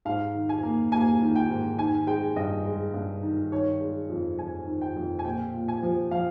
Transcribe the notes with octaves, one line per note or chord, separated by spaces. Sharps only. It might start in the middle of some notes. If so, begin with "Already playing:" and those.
G#2 F5
D#3
G#5
A#3
A#3 G#5
D#3
G5
G#2
D#3 G#5
G#3 G5
G2 D#5
G#3
G2
D#3
D#3 C#5
G#3
F2
F2 G#5
D#3
G5
F2
G#5
A#2 G5
A#2
G#5
F3
F3 F5